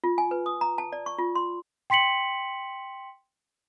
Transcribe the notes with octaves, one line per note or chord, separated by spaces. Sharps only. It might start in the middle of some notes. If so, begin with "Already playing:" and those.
F4
G#5
B4
D#6
A#5
A5
D5
C#6
F4
C6
G5 C6 B6 C#7 F#7